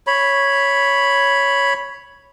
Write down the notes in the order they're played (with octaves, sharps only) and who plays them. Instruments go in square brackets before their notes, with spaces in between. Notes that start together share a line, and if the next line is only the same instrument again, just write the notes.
[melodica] C#5 B5